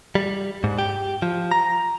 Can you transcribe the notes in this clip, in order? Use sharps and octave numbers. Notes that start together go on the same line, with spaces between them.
G3
G#2
G4
F3
A#5